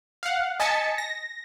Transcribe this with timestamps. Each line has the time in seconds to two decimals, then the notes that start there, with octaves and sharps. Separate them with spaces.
0.23 F5 F#5
0.60 D#5 G#5 A5 A6 B6 C#7
0.98 A#6